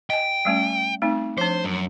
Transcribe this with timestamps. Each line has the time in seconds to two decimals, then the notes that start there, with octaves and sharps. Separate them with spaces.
0.10 D#5 G5 G#5
0.45 G3 A3 C#4
1.02 A3 C4 D#4
1.38 F3 D4 C5
1.64 F#2